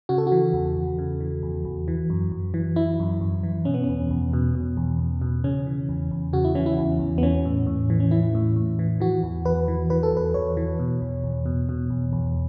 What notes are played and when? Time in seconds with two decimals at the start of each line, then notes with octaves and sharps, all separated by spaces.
0.09 C#3 F#4
0.18 A4
0.27 F#4
0.32 E3
0.53 E2
0.76 E2
0.98 C#3
1.21 E3
1.43 E2
1.65 E2
1.88 E3
2.10 F#2
2.32 F#2
2.54 E3
2.76 E3 E4
3.00 F#2
3.21 F#2
3.43 E3
3.65 B2 C#4
3.74 B3
3.84 E2 C#4
4.11 E2
4.33 B2
4.55 B2
4.77 E2
4.99 E2
5.21 B2
5.44 C#3 C#4
5.66 E3
5.89 E2
6.11 E2
6.33 C#3 F#4
6.44 E4
6.55 E3 C#4
6.66 E4
6.79 E2
7.00 E2
7.18 B3
7.23 E3 C#4
7.45 A2
7.67 A2
7.90 E3
8.00 C#4
8.11 E3 E4
8.35 A2
8.56 A2
8.79 E3
9.01 E3 F#4
9.23 E2
9.45 E2 B4
9.68 E3
9.90 E3 B4
10.03 A4
10.13 E2 B4
10.34 E2 C#5
10.57 E3
10.79 B2
11.01 E2
11.24 E2
11.46 B2
11.69 B2
11.90 E2
12.13 E2